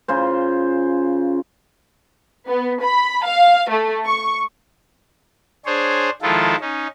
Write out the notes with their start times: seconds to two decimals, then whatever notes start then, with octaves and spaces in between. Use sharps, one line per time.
0.08 C#3 F4 C5
2.47 B3
2.81 B5
3.25 F5
3.70 A3
4.05 C#6
5.66 D4 G#4 C5 C#5
6.22 D#3 F3 G#3 E4 F4 A4
6.61 C#4 D#4